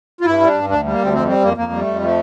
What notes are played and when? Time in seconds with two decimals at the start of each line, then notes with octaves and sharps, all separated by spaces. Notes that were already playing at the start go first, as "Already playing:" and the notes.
0.21 F4
0.25 G2 E4
0.40 G3
0.47 D4
0.54 G2
0.69 D2 D4
0.84 G3
0.91 A#3
0.98 D2 C4
1.13 F2 C4
1.28 G3 C4
1.43 F2 A#3
1.57 F2 A#3
1.72 G3
1.80 A3
1.87 F2
2.01 F3 A3